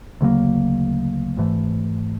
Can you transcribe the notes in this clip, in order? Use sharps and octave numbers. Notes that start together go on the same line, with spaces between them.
D2 C#3 F#3 A#3
G#1 G#2 E3 A3